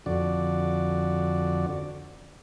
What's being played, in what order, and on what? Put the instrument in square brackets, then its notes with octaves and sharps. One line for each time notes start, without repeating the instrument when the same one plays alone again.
[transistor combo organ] F2 D3 F#4 D5